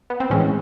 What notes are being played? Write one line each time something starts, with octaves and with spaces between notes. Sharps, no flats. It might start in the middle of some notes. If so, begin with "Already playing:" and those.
B3
C4
A2 E3 G#3 C#4